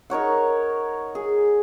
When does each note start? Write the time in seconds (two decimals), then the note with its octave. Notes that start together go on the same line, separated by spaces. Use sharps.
0.10 D#4 A#4 C#5 F#5
1.15 G#4